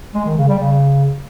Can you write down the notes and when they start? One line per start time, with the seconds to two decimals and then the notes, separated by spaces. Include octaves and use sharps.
0.15 G#3
0.26 D#3
0.37 C#3
0.48 G3
0.59 C#3